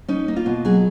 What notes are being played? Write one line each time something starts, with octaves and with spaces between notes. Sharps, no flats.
C#4 D#4
A#3
F4
B2
F#3 G#4